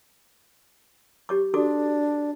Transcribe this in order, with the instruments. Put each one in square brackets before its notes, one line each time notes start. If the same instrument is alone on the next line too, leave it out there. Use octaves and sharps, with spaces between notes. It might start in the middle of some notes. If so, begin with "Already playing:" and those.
[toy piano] G4 C#5 D6
[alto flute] D4 [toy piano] F#4 A4 D6